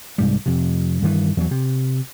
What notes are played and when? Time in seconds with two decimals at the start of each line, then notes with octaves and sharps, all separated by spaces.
0.18 C2 G#2 G3
0.46 F2 C3
1.02 G2 D#3 E3
1.37 E2 F#3
1.51 C3